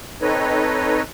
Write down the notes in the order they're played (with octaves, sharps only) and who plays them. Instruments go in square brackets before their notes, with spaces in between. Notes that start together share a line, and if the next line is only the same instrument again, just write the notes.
[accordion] C4 D#4 A4 B4 C#5 D#5